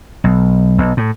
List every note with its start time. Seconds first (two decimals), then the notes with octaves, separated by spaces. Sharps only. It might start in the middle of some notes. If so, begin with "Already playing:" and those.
0.24 B1
0.78 B1
0.97 A2